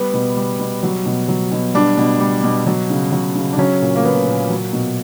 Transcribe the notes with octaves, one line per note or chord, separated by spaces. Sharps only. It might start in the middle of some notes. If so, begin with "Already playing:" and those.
Already playing: G3 B3
B2
G3
B2
F#3
B2
F#3
B2
G3 D4
B2
G3
B2
F#3
C#3
F#3
C#3
D4
F#3 C#4
A#2
A#3
F#3 B3
A#2
F#3
B2